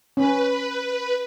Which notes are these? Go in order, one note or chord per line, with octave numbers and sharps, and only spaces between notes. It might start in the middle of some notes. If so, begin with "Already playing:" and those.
C#4 B4